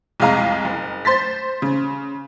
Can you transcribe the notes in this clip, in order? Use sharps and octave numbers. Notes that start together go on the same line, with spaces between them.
C2 F2 G#3 F5 A#5
F#1
C5 C6 A6 B6
C#3